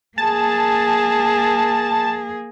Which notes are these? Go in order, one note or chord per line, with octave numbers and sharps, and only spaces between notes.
A#3 G#4 A5